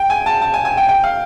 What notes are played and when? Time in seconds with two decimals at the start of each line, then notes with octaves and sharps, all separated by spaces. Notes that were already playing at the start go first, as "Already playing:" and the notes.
Already playing: G5
0.10 G#5
0.26 A5
0.42 A5
0.54 G#5
0.65 G#5
0.77 G5
0.89 G5
1.04 F5